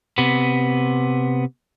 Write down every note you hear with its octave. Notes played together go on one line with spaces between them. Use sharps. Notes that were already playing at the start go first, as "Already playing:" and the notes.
C3 B3